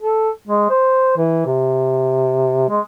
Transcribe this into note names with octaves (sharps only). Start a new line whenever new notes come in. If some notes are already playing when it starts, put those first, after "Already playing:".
A4
G#3
C5
E3
C3
G#3